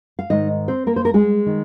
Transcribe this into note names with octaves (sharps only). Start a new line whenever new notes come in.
F5
G#2 D#3 D#4 D#5
C4 C5
A#3 A#4
C5
A#4
G#3 G#4
D#3